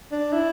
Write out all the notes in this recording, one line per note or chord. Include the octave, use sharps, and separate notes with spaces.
D4
E4